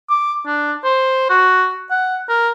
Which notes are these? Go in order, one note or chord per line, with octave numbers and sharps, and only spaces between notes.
D6
D4
C5
F#4
F#5
A#4